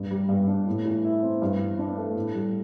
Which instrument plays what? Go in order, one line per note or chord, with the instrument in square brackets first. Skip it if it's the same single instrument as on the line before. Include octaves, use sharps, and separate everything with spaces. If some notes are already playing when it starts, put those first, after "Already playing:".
Already playing: [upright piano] G2
G3
G2
D4
A2
E3
E4
C4
G2
E3
D4
A3
A2
G3